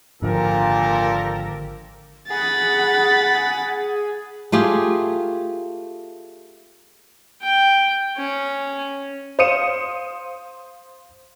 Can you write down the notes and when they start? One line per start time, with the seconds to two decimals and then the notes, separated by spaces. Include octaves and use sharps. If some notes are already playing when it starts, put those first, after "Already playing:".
0.22 G#1 A#2 D3 F3 G4 A4 A#4
2.30 G#4 F#5 B5 A6
4.52 A3 F4 G4 G#4
7.42 G5
8.17 C#4
9.39 C5 F5 D#6 C#7 D#7 E7